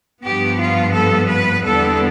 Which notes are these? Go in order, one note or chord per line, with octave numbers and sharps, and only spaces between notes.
G2 F3 B3 G4
F4
A4
B4
E2 D3 G3 B3 A4